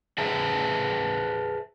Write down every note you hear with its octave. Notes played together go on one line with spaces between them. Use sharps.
G#4 B4 C5 E5 A5 A#5